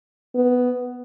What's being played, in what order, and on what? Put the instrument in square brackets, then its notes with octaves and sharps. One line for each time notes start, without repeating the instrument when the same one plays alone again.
[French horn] B3